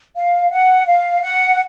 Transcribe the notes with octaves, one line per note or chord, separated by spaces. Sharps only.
F5
F#5
F5
F#5